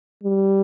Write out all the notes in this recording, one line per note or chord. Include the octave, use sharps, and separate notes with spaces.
G3